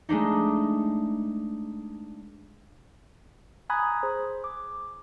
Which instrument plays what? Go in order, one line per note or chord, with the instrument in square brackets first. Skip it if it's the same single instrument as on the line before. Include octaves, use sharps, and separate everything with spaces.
[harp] G#3 A3 D4 D#4
[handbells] G#5 A#5 B5 D#6 F#6 G#6
G#4 C5
D6